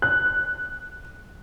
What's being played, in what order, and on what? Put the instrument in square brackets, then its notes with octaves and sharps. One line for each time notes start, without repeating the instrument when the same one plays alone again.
[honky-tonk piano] F#6